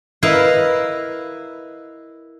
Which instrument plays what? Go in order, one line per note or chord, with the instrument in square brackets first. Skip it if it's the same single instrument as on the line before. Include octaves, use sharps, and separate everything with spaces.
[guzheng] E4 A#4 B4 D#5 F5